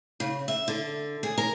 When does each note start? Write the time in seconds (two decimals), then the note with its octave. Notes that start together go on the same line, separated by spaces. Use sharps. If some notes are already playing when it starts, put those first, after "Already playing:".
0.20 C#3
0.48 E5
0.68 D3
1.23 G#4
1.38 A#4